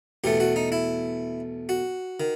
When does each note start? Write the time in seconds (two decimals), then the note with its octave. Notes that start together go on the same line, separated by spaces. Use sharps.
0.24 E2 B2 A3 G4
0.40 F#4
0.56 D#4
0.72 E4
1.69 F#4
2.20 D#3